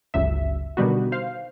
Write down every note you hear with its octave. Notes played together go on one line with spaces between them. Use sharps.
G1 C#2 F#2 E5
B2 D3 D#3 G3 B3 F#4
C5 F5